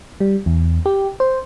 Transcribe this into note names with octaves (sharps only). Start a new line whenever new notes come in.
G3
E2
G4
C5